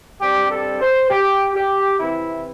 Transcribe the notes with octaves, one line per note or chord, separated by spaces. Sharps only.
G2 G3 C4 G4
A4
C5
G4
G4
C3 E3 C4 E4